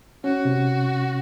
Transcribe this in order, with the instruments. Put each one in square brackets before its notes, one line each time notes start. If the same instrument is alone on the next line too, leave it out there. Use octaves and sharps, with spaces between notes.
[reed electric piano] C#4 [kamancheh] F#4
[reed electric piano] C3